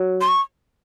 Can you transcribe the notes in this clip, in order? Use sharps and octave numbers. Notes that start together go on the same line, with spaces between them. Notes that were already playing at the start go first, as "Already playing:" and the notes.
Already playing: F#3
C6
C#6